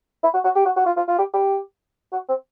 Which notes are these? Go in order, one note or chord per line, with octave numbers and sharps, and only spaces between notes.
E4
F#4
F#4
G4
F#4
F#4
F4
F4
F4
G4
G4
F#4
C4